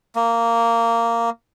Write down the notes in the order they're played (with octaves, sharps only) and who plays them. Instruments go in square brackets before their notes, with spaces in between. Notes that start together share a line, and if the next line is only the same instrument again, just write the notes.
[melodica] A#3